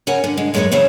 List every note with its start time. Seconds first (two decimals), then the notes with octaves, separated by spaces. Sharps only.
0.07 C#3 C#4 A#4 F#5 G#5
0.24 D3
0.37 D3 G#3
0.54 F#2 G#3 D#4 A4 B4 C#5
0.71 C#3 E3 C4 C5 C#5